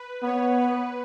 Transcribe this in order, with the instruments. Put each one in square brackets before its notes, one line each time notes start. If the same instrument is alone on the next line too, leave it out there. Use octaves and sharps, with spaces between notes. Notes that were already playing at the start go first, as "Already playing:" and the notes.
Already playing: [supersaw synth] B4
[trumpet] B3 [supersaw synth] C#5
[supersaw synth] B4